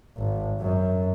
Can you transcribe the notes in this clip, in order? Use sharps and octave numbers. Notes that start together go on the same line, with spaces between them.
G#1
F#2